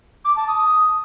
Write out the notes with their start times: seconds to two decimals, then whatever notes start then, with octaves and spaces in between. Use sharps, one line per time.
0.25 D6
0.36 A5
0.48 D#6